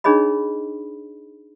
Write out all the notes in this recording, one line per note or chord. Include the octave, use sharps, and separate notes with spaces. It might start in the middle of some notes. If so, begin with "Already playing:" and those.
D4 D#4 G#4 C#5 D#5 B5